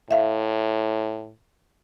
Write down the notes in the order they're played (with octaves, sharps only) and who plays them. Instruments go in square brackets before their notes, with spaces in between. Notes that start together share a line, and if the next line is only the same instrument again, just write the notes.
[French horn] A2 [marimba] E5 F5